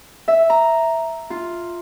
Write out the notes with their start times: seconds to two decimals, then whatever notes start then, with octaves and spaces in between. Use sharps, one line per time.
0.28 E5
0.50 A#5
1.30 F4